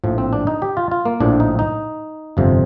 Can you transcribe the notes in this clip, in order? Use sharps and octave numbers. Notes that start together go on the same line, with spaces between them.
A#1 A2 F3
C4
D4
D#4
G4
F4
F4
A#3
A#1 A2 F3 D4
D#4
D#4
G1 F2 C3 F3